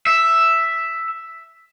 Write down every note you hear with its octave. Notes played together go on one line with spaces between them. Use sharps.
E5